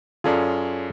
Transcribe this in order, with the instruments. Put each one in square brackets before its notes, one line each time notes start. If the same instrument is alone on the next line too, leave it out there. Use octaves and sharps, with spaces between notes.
[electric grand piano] F#2 C#4 G#4 [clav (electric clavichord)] F4 A4 D5